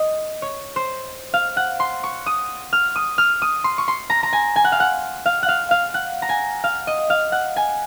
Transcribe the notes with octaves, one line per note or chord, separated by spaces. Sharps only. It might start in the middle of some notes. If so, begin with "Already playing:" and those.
Already playing: D#5
C#5
C5
F5
F#5
C6
C#6
D#6
F6
D#6
F6
D#6
C6
C#6
C6
A#5
A#5
G#5
G#5
F#5
F5
F#5
F5
F#5
F5
F5
F#5
A#5
G#5
F5
D#5
F5
F#5
G#5